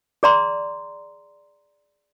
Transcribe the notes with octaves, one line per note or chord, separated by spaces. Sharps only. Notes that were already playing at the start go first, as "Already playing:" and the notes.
G#4 D5 A#5 C6